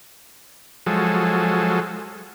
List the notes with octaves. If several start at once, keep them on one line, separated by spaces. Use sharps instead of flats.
F3 F#3 G#3 A4